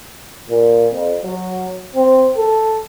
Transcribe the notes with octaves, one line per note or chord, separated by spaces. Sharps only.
A#2
F2
F#3
C4
A4